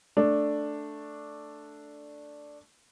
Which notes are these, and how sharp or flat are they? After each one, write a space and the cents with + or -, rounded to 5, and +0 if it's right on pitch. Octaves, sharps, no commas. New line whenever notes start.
A3 +0 D4 +0